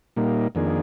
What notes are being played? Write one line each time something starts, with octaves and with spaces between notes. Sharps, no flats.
A#2 G3 A#3 D#4
F2 D#3 A#3 D4 G#4